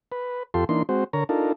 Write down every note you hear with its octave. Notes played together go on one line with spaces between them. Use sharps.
B4
F2 F4 G4 A4 C6
E3 A#3 D4 D#4 C6
G#3 C4 F#4 C5
D3 A#4 C#5 A#5
D4 D#4 F4 A4 A#4